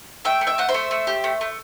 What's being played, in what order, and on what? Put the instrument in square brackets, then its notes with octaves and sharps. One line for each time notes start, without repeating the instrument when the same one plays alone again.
[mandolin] A3 E5 G5
A3
E5 G5
A3 F#5
C5 E5
A3
A3
G4
A3
A3